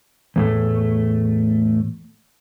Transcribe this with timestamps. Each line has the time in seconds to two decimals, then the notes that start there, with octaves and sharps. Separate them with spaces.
0.36 E2 A2 A3